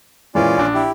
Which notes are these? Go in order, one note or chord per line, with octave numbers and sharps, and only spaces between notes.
A#2 E3 G#3 C#4 F4 D5
A#1 D4
E4 G4